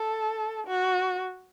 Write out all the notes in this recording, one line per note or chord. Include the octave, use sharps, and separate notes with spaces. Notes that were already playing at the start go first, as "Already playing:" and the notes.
Already playing: A4
F#4